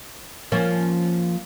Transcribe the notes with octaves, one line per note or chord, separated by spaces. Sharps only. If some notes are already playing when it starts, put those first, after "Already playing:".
F3 A#3 C#4